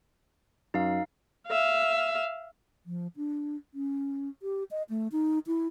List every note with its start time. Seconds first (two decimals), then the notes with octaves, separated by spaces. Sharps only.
0.74 F#2 D#4 F5
1.47 E5 F5
2.86 F3
3.17 D4
3.74 C#4
4.42 G4
4.71 D#5
4.90 A3
5.12 D#4
5.47 E4